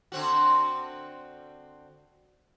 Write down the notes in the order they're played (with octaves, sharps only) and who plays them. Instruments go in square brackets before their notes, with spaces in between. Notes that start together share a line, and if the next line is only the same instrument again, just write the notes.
[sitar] D3 C4 F#4